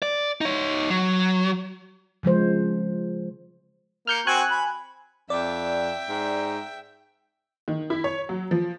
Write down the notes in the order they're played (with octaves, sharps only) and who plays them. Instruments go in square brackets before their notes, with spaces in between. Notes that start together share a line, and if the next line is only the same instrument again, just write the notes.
[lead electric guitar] D5
D#4 C#5
F#3
[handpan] C#3 F3 G#3 C5
[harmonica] A#3 [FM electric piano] F6 G6 C#7
[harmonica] C4 F#4 C#6 [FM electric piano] G#5 F#6
[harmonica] B5
[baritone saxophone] F2 [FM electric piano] D5 [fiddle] E5 G5
[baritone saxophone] G#2
[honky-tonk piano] D#3
E4
C#5
F#3
F3